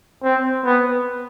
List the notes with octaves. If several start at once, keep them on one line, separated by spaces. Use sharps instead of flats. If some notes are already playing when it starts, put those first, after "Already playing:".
C4
B3